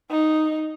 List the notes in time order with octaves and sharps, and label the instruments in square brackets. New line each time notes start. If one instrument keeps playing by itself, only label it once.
[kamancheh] D#4